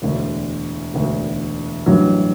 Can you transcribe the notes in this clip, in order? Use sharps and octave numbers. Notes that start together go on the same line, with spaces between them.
E1 D2 D3
E1 D2 D3
A1 G2 F#3